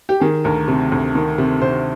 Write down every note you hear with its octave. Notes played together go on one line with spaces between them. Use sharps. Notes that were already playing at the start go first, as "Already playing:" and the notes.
G4
D#3 G#4
D2 A#4
C3
D2
D#3
C3
C3 C5